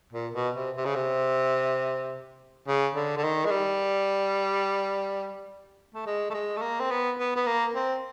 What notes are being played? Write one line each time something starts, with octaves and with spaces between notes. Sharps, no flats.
A#2
B2
C3
C3
C#3
C3
C#3
D3
D3
D#3
G#3
G3
A3
G#3
A3
G#3
A3
A#3
C4
B3
B3
B3
A#3
C4